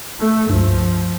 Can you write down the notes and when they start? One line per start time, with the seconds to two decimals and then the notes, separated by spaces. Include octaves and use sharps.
0.20 A3
0.49 C#2 G2 F3